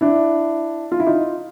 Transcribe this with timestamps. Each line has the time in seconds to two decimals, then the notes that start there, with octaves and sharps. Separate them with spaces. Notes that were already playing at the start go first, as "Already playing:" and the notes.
0.01 D4 E4
0.92 F4
1.00 E4
1.07 D#4 F4